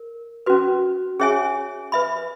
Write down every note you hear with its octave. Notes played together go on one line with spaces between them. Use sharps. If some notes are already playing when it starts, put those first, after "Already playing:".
Already playing: A#4
C#4 F#4 B4
C#4 G#4 C#5 E5 G#5
B4 E5 B5